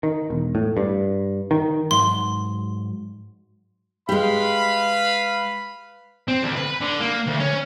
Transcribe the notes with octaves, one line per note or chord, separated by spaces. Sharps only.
D#3
E1
A2
G2
D#3
G#2 F#3 E5 C6
G#3 G4 B4 F5 B5
C4
D2
B4
D3
A#3
D2
C#4